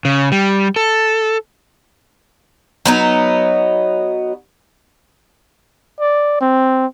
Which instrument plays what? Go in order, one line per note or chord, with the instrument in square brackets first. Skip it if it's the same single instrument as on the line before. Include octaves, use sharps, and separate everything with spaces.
[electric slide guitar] C#3
G3
A4
[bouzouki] F#3 B3 D#4
[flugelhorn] D5
C4